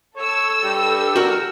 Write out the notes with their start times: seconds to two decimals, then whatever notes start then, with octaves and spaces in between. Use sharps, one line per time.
0.16 A4 C#5 E6
0.64 G2 G3 G5
1.16 F#4 A#4